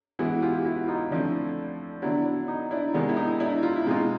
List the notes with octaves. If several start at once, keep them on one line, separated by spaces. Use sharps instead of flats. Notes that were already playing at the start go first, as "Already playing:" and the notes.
E3 G#3 B3 E4 F#4
F4 G4
G4
E4 F#4
D#4 F4
D3 F3 A3 C4 D4 E4
D3 F#3 B3 D4 E4
D4
D#4
D4 E4
C3 D#3 G#3 B3 D4
E4
D#4
D4 E4
F4
E4
B2 G#3 C4 D#4 F4